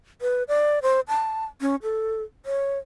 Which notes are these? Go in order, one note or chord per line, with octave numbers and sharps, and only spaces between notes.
B4
D5
C5
A5
C#4
A4
C#5